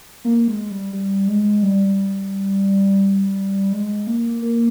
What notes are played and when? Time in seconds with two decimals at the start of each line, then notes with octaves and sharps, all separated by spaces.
0.25 A#3
0.48 G#3
0.71 G3
0.93 G3
1.28 G#3
1.63 G3
3.73 G#3
4.07 A#3
4.42 A#3